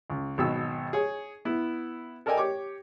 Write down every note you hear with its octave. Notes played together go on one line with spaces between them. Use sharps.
C#2
G#1 B2 F#3 E6
G#4 C#5
B3 E4
A4 A#4 D5 D#5 G5 G#5
G4 C#5 D6